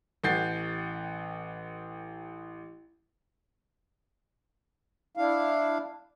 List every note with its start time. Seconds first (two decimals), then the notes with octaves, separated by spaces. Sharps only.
0.24 A1 F#5 G5 G6 A6 C7
5.17 D4 E4 F5